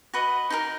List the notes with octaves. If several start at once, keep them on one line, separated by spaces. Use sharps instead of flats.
F#4 B4 D#5
D#4 G4 A#4